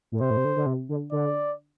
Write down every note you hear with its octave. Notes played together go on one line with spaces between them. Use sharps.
A2
C3 C5
A2
C3
D3
D3
C3
D3
D3 D5